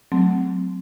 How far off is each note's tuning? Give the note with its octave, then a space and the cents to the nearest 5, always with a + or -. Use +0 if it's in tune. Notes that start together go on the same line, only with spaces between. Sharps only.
F#3 +0 A3 -5 C4 -20